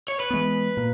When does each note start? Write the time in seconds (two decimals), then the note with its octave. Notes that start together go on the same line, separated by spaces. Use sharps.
0.08 C#5
0.20 B4
0.30 E3 G#3 B3
0.77 A#2 A#3